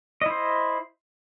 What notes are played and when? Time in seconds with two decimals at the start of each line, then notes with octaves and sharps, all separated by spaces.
0.22 D#5
0.26 E4
0.30 C5